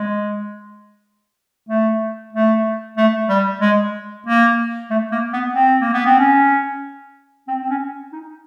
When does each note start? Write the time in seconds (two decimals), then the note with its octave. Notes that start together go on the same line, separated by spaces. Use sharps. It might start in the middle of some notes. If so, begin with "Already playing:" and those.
Already playing: G#3
1.69 A3
2.33 A3
2.97 A3
3.29 G3
3.61 G#3
4.27 A#3
4.91 A3
5.12 A#3
5.33 B3
5.55 C4
5.80 A#3
5.94 B3
6.06 C4
6.19 C#4
7.48 C4
7.62 C4
7.70 C#4
8.13 D#4